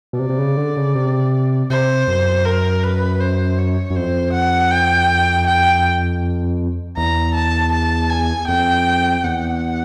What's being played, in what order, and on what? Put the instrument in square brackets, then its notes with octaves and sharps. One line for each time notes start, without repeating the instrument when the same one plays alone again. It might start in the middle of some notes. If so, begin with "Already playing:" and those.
[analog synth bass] B2
[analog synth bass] C3 [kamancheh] D5
[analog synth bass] C3
C#3
D3
C#3
C3
[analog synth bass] C3 [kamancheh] C5
[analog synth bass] F#2
[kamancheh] A#4
B4
C5
C#5
[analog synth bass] F#2
[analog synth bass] F2 [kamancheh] C5
[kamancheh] F#5
G5
G5
[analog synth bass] E2 [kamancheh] A#5
[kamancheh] A5
A5
G#5
[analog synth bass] F2 [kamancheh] G5
[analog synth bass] E2 [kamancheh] F#5